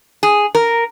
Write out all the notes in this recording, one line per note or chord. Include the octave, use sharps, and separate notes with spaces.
G#4
A#4